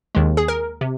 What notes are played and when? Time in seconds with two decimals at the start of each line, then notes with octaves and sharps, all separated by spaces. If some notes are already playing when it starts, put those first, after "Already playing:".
0.15 D#2 D#3 G#3
0.37 G#4
0.48 A#4
0.81 C3